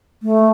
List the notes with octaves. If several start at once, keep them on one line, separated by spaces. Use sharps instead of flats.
A3